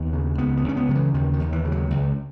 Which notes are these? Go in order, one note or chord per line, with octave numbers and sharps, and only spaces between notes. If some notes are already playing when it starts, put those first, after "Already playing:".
Already playing: D#2 B3
C#3
C#2 B3
B3
C#2 C#4
B3
C#3 F#3
E3
D#2 D#3
D#3
D#2
E3
C#3
F#3
C#2